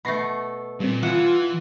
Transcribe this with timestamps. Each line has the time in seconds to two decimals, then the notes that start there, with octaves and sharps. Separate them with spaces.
0.05 B2 A3 B5 A#6 C7
0.80 A#2 G3 C4
1.03 E3 F4 E5 F#5 G#5